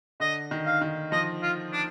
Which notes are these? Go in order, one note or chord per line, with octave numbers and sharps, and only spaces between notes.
D3 D#5
D#3
F5
D#3
F3 D#5
F4
D4